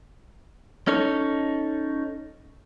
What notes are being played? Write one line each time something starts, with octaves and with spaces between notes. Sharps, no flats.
C#4 D#4 A4 C#5